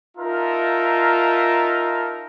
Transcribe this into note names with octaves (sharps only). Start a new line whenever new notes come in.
D#4 F4 A#4 E5 A5 A#5